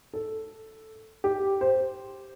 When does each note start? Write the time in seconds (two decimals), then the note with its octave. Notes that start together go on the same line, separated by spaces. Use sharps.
0.13 A4
1.24 G4
1.61 C5